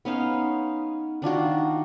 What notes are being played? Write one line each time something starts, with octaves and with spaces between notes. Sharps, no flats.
B3 C#4 D#4 F5
D#3 D4 F4 F#4